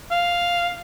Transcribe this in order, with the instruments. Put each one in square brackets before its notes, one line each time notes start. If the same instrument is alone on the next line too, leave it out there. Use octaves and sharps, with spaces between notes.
[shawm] F5